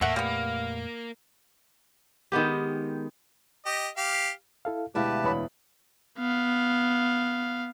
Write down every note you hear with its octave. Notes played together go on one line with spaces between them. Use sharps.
E2 A2 A3 A#3 E5 F#5
F2 A#2 G3 A3 B3 F5
D#3 G#3 B3 G4
G4 D#5
G4 F5
E4 A4 F5
D2 B2 G#3 E4 G4 B4 F5 A5
E2 C#5 B5
B3 F5